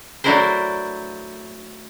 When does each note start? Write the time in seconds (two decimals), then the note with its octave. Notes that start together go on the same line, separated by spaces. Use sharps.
0.24 F#3 A3 D4 E4 A#4 C5